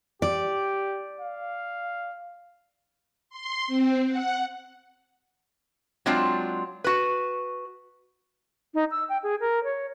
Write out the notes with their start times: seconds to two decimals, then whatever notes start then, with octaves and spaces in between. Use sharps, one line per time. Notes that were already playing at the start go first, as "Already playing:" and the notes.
0.22 G4 D5
1.20 F5
3.29 C6
3.67 C4
4.08 F#5
6.06 F#3 G#3 C4 D4 F4
6.84 F#4 B4
8.74 D#4
8.91 E6
9.09 G5
9.23 G#4
9.40 A#4
9.64 C#5